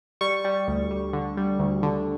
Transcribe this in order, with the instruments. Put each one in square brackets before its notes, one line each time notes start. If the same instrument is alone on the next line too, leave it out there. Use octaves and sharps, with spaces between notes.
[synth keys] G3 C#6
G3
D2
G3
D3
G3
D2
D3